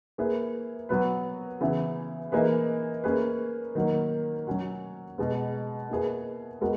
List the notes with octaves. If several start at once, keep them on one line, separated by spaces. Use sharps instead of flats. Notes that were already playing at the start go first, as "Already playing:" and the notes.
A#3 E4 G#4 B4
F#3 B3 F#4 B4
C#3 E3 B3 E4
E3 A#3 D#4 G#4 B4
A#3 C#4 G#4 B4
D#3 F#3 A#3
F#3 C#4 F#4
B2 G#3 B3
A#3 E4 G#4 B4
G#3 B3 F#4 A#4